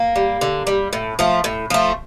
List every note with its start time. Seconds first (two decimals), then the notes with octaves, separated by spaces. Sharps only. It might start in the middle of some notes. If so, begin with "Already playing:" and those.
Already playing: A#3
0.16 G3
0.41 D3
0.67 G3
0.93 A2
1.19 F3 A3
1.44 A2
1.70 F3 A3